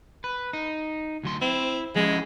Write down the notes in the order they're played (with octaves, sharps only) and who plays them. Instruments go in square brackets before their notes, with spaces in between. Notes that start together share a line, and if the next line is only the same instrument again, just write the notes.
[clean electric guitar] B4
D#4
D2 F#3 C6
[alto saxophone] C4 [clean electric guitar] E4
[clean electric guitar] F3 C#4 E4 [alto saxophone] G#3